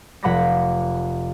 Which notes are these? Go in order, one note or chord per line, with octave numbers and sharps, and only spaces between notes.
F1 F#5 B5 D6 A#6 B6